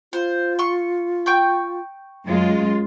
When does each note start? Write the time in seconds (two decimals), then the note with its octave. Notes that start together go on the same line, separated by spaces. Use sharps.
0.13 F4 C5
0.59 C6 C#6
1.26 G5 C#6 G6
2.27 F#2 G#3 F4